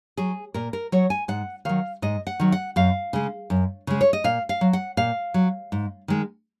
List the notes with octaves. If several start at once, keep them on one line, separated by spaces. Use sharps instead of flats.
F#3 G#4
A#2 A#4
A#4
F#3 C#5
G#5
G#2 F#5
D#3 F#3 F5
G#2 D#5
F#5
D#3 F#3
F#5
F#2 F5
C#3 G#3
F#2
C#3 G#3
C#5
D#5
A#2 F5
F5
F#3
F#5
A#2 F5
F#3
G#2
D#3 G#3